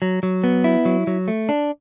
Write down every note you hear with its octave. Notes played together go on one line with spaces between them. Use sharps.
F#3
F#3
B3
E4
F#3
F#3
A3
D4